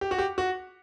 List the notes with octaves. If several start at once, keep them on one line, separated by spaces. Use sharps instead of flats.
G4
F#4
G4
F#4